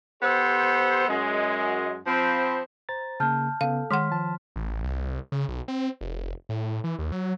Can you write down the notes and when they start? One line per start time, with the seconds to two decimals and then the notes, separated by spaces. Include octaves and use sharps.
0.22 B3 G4 A4 C5
1.08 F#2 G#3
2.06 F3 C4 B5
2.89 C5 A#5 A6
3.20 C#3 A#3 A5 F6 G6
3.61 C#3 B3 A4 F5
3.91 D#3 G#3 F#5 C6 F6 B6
4.12 F3 A5
4.56 A1
4.83 C2
5.32 C#3
5.49 B1
5.68 C4
6.01 F1
6.49 A2
6.84 E3
6.99 D#2
7.12 F#3